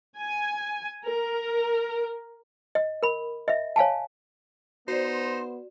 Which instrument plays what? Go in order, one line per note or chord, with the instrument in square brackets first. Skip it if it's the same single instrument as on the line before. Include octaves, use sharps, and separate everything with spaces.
[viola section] G#5
A#4
[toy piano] D#5
A#4 B5
D#5 E5
C#5 F5 G#5 A5
[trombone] B3 [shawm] D#4 [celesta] F#4 D5 [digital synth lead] C5